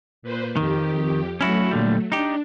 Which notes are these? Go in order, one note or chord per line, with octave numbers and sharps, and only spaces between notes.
A#2 B4 C5
F2 D#3 G4
F#3 A3 C#4 E4 F#4
A#2 D3 G3
D4 D#4 G4